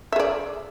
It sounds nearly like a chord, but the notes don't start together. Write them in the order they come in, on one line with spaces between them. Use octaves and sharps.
E5 G#4 D5